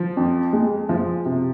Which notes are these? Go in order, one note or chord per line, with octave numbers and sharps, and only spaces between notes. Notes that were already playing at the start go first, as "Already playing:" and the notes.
Already playing: F3
F2
G#3
F3
C3